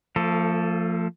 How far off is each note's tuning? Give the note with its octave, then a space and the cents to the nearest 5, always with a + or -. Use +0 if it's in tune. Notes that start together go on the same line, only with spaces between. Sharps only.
F3 +0 A3 +40 A4 +0